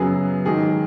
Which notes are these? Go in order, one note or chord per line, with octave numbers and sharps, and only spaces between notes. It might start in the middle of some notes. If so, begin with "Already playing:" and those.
Already playing: F#2 C#3 F#3 B3 G#4
G#2 D#3 F#3 G#4